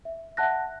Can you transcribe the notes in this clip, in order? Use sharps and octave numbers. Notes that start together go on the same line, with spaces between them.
E5
E5 F#5 A5 F#6 A#6